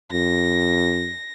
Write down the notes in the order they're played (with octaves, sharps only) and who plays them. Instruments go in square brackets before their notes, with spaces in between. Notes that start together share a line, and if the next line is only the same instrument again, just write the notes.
[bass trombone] F2 [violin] A#6